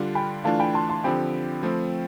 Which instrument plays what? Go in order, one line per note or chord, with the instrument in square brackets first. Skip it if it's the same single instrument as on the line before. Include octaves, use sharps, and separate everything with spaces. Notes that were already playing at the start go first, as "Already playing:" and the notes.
Already playing: [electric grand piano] D3 G3 D4 F4
[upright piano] G5 B5
[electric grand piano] E3 A3 D4 F4 [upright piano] F5 A5
[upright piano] G5 B5
A5 C6
A5 C6
[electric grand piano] D3 F3 C4 G4 [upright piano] G5 B5
[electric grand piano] F3 A3 C4